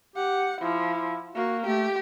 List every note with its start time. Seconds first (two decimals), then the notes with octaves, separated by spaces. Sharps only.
0.16 G4 F#5
0.61 F3 E4
1.35 A#3 F#4
1.66 A3 G4